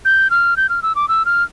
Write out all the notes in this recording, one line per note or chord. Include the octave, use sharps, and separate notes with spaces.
G6
F6
G6
F6
E6
D6
E6
F6